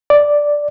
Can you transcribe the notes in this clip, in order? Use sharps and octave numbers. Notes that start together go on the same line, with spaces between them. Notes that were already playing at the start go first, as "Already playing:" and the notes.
D5